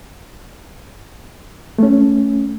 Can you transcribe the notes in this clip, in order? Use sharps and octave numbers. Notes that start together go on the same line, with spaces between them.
A3 C#4